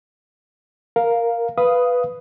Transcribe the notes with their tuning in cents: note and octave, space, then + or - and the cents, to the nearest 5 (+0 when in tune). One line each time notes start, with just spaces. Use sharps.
A#4 +0 F5 +0
B4 +0 F5 -10 D#6 +0